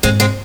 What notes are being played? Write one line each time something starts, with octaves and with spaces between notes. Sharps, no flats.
G#2 G#3 C4
G#3 C4